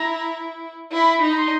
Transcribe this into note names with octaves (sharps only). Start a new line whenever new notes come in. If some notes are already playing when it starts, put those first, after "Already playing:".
Already playing: E4 A#5
E4 B5
D#4
B5
C6